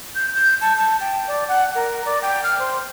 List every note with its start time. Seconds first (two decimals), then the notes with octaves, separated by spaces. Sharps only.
0.15 G6
0.35 G6
0.61 A5
0.76 A5
1.01 G5
1.28 D5
1.48 F#5
1.75 A#4
2.06 D5
2.22 G5
2.44 F6
2.59 C5